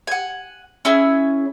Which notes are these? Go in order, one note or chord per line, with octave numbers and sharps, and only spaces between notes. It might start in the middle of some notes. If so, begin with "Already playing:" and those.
F#5 G#5
C#4 E4 G#4 E6